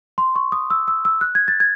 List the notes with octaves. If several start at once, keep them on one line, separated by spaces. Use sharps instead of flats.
C6
C#6
D#6
E6
E6
E6
F#6
G#6
A6
G#6